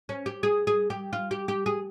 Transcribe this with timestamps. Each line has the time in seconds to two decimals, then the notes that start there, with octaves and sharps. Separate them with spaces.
0.09 C#4
0.26 G4
0.43 G#4
0.67 G#4
0.90 G4
1.13 F4
1.31 G4
1.48 G4
1.66 G#4